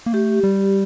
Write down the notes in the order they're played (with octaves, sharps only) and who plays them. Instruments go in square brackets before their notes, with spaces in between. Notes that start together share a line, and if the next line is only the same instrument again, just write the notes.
[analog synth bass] A#3
[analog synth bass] A3 [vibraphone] G4
[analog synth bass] G3